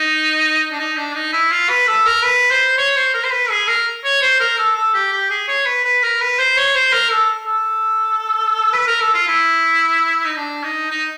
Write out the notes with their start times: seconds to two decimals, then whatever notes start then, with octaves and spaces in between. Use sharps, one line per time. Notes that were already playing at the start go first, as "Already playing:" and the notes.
Already playing: D#4
0.72 D4
0.79 D#4
0.97 D4
1.15 D#4
1.33 E4
1.52 F4
1.69 B4
1.87 A4
2.06 A#4
2.24 B4
2.51 C5
2.78 C#5
2.96 C5
3.14 A#4
3.24 C5
3.32 B4
3.50 G#4
3.68 A#4
4.04 C#5
4.22 C5
4.40 A#4
4.58 A4
4.76 A4
4.94 G4
5.12 G4
5.30 G#4
5.48 C#5
5.66 B4
5.84 B4
6.03 A#4
6.21 B4
6.39 C5
6.57 C#5
6.75 C5
6.93 A#4
7.11 A4
7.47 A4
8.73 B4
8.87 A#4
9.00 A4
9.14 F4
9.28 E4
10.25 D#4
10.36 D4
10.63 D#4
10.91 D#4